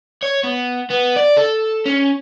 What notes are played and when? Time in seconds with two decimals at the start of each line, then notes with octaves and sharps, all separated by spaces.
0.23 C#5
0.43 B3
0.90 B3
1.16 D5
1.37 A4
1.85 C#4